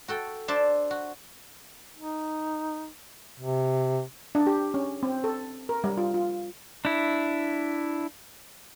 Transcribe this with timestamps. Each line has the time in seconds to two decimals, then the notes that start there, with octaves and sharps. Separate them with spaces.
0.08 F#4 A4 G5
0.48 D4 C5 D5 E5 A5
0.91 F#4
1.96 D#4
3.39 C3
4.35 D4
4.47 G4
4.74 C#4
5.03 C4
5.24 A4
5.69 A#4
5.84 G3
5.98 F4
6.14 F4
6.85 D4 E4